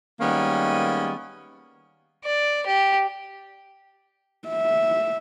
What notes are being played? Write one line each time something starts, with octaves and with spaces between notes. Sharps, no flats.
D#3 G3 G#3 A#3 B3 C#4
D5
G4
E5